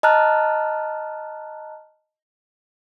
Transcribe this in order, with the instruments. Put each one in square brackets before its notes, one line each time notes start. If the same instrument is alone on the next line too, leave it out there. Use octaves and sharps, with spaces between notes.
[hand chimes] D#5 A5 A#5 F6 F#6